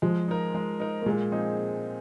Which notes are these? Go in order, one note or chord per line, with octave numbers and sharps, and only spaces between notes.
F3 G#3
D#4 A#4
G#3
D#4 A#4
A#3
A#2 G#3
F3 C4 D#4 G#4